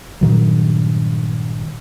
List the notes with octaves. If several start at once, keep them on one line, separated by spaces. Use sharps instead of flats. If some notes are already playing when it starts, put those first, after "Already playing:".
G2 A#2 D#3 F#3